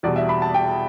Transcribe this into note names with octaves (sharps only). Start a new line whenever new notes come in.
E2 B2 G3 D5
E5
B5
A5
G5